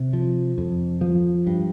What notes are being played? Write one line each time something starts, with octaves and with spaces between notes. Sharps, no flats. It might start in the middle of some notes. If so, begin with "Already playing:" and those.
Already playing: C3
F3
F2
F3
G2